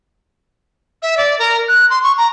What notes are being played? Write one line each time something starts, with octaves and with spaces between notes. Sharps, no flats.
E5
D5
A#4
F#6
C6
C#6
A#5